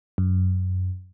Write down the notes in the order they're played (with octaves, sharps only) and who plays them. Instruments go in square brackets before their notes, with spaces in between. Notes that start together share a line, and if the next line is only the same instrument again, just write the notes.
[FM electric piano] F#2